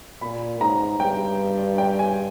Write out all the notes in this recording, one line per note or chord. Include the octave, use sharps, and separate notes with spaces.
A#2 B5
G#2 A#5
G2 G5
G5
G#5